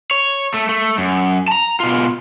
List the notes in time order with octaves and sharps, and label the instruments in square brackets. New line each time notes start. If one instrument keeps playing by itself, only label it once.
[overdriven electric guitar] C#5
A3
A3
F#2
A5 A#5
B2 F4